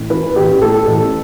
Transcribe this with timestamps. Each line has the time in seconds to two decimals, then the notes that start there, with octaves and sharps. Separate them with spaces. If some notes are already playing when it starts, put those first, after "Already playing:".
Already playing: A1
0.10 E3 B4
0.36 A1 G4
0.61 A2 A4
0.87 A1